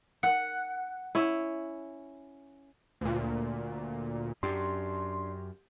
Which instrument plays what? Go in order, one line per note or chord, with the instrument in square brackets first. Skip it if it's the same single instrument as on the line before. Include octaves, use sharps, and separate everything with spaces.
[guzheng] F#5
[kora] C#4 E4
[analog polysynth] D2 A#2
[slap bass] F#2 [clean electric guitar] D4 [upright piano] G4 [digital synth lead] C6